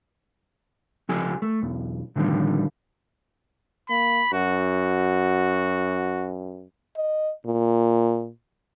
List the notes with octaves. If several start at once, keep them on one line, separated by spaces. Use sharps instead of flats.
C#2 F3 G4 A4 G#5
A3
B1 E2
A2 D3 D#3 F3 G3
A#3 B5
F#2 F#4
D#5
A#2